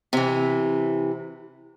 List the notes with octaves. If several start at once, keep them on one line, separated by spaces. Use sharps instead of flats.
C3 E3